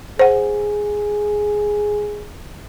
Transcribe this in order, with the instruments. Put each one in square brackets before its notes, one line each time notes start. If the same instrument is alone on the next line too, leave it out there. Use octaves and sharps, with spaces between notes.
[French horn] G#4 [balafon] C5 F#5